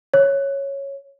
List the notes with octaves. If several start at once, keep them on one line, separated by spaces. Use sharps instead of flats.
C#5